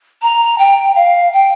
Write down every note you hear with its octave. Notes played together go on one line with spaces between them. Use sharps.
A#5
G5
F5
G5